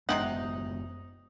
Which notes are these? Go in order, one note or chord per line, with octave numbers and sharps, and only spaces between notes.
F#1 C3 G#3 B3 C#4 D#4 F#5